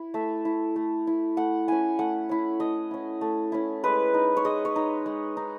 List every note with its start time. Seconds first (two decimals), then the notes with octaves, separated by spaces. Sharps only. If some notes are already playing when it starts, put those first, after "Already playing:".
Already playing: E4
0.14 A3 E5
0.45 E4
0.76 A3
1.07 E4
1.37 A3 F#5
1.68 C#4 E4 G#5
1.99 A3 F#5
2.29 C#4 E4
2.60 A3 D#5
2.91 C#4 E4
3.21 A3
3.52 C#4 E4
3.84 G#3 B4
4.14 D#4
4.37 C#5
4.45 G#3 D#5
4.65 C#5
4.76 D#4
5.06 G#3
5.37 D#4